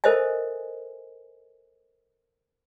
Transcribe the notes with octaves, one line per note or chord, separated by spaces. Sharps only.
A4 A#4 C5 D#5 E5 G#5